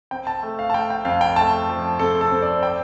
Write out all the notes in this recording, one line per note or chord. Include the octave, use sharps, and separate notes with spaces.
C4 G5
A5
A3
F5
A5
A3 G5
G5
F2 F5
G5
A3 A5
F3
C4 A4
A4
C4
D5
G5